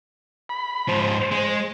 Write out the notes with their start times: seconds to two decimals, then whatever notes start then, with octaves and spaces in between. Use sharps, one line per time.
0.49 B5
0.89 G#2 F3 C5
1.32 G#3